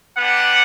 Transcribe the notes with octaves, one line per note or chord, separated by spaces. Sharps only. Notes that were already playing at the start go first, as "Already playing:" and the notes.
B3 D4 G4 F#5